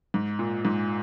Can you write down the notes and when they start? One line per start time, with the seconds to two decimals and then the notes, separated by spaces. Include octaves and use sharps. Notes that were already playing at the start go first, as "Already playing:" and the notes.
0.14 G#2
0.39 A#2
0.65 G#2